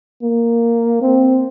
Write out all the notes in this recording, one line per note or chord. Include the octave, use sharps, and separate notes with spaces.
A#3
C4